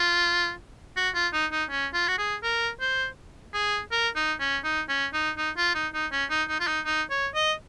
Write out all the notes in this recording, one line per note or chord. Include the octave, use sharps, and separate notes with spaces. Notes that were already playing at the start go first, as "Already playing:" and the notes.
Already playing: F4
F#4
F4
D#4
D#4
C#4
F4
F#4
G#4
A#4
C5
G#4
A#4
D#4
C#4
D#4
C#4
D#4
D#4
F4
D#4
D#4
C#4
D#4
D#4
F4
D#4
D#4
C#5
D#5